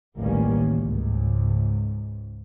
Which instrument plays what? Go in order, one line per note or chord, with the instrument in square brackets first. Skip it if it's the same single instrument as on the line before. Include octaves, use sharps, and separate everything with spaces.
[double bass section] A1 D2 D#3 G3 A#3 C#4
C#2 G#2